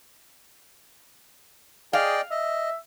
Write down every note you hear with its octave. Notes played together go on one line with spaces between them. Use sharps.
G#4 D5 D#5 F5 G5
D#5 E5